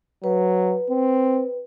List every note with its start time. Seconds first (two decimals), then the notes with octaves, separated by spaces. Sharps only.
0.24 F#3 B4
0.90 C4